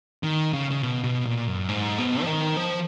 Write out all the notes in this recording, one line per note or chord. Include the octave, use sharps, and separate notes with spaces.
D#3
C#3
C#3
B2
B2
A#2
F#2
G#2
B2
F3
D#3
F3